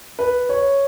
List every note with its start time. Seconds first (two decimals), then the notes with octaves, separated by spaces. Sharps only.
0.19 B4
0.49 C#5